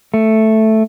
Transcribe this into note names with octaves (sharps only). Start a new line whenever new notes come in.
A3